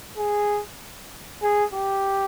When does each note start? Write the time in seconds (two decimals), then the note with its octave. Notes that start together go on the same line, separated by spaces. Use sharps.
0.18 G#4
1.43 G#4
1.73 G4